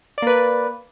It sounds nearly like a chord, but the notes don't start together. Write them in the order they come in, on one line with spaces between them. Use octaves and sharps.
D5 A#3 B4